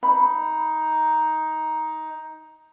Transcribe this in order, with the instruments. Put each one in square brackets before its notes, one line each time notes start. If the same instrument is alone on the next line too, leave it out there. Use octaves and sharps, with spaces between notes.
[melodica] D#4 [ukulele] B5